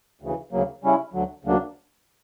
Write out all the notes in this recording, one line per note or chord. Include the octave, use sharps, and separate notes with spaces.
D2 C#3 E3
D2 C#3 F#3 A#3
C#3 G3 C#4 E4
D2 D3 F#3
D2 C#3 F#3 A#3 D4